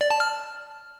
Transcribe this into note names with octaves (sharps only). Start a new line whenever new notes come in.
D5
A5
F6